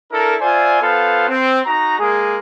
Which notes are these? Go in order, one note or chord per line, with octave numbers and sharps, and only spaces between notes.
D4 E4 A4 A#4
F4 C5 D5 E5 G#5
B3 F4 A4 C5 F5
C4
D#4 F#4 A#5
G#3 A#3 G#4